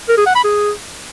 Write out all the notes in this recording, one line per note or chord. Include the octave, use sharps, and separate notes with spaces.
A#4
G#4
F#5
B5
G#4